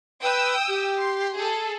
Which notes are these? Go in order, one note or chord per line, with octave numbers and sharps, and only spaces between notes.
B4 G5 D#6 E6
G4
C6
G#4 A4